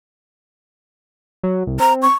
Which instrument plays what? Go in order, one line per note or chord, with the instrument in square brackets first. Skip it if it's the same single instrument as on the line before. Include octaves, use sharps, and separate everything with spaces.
[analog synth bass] F#3
C2
[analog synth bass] C4 [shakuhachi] A#5
[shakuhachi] C#6